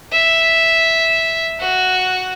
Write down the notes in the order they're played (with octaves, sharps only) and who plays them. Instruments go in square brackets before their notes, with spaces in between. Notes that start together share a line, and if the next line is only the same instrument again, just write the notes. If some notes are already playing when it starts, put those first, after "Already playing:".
[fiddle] E5
F#4